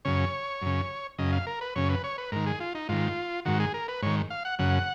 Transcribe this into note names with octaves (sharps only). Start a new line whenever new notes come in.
F#2 C#3 C#5
F#2 C#3
F#2 C#3 D#5
F5
A#4
B4
F#2 C#3 C#5
B4
C#5
B4
G#2 D#3 A#4
G#4
F4
D#4
G#2 D#3 F4
G#2 D#3 F#4
G#4
A#4
B4
G#2 D#3 C#5
F5
F#5
F#2 C#3 F#5